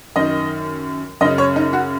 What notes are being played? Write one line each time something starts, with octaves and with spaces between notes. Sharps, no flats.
F#2 D#3 D#5
F#2 C#3 D#5
C#5
D#4
F#4